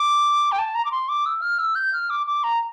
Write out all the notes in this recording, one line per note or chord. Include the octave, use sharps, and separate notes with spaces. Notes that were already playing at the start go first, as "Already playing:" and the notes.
Already playing: D6
G5
A5
A#5
D6
C6
D6
E6
F6
E6
G6
F6
D6
D6
A#5